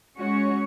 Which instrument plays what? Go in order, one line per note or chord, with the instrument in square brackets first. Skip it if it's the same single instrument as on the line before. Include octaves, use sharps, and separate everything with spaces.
[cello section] G#3 C#4 F#4 C#5